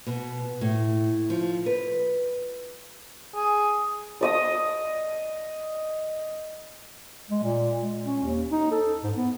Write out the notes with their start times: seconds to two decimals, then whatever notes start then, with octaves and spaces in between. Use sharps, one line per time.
0.06 B2
0.61 A2
1.30 F3
1.66 B4
3.35 G#4
4.21 D5 D#5 D#6
7.30 G#3
7.43 A#2
7.80 G#3
8.05 C#4
8.23 D#2
8.52 D#4
8.72 A4
9.04 G#2
9.16 B3